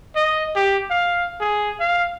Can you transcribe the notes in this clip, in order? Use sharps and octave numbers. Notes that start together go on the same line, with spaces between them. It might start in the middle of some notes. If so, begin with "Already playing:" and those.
D#5
G4
F5
G#4
F5